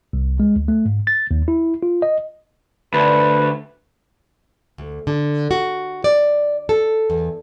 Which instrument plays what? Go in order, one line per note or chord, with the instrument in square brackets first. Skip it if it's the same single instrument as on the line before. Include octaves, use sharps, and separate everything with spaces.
[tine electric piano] C2
G#3
D2
A3
G#2
A6
D#2
E4
F4
D#5
[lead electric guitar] D2 [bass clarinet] B4
[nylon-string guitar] D2
D3
F#4
D5
A4
E2